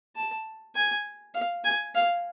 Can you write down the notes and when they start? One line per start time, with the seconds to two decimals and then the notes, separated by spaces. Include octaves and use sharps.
0.16 A5
0.75 G#5
1.34 F5
1.64 G#5
1.95 F5